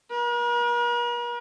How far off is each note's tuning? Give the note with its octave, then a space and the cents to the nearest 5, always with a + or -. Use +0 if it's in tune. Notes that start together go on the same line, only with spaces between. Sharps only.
A#4 +45